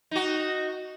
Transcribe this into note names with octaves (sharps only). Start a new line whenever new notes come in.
D#4 F#4